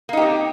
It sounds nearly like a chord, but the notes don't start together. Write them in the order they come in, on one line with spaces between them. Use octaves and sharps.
A#3 D#4 G4 C4